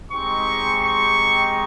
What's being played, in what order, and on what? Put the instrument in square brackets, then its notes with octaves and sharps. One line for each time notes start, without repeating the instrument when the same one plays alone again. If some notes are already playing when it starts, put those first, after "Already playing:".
[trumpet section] G#3 C4 D#4 G4 C#6
C#6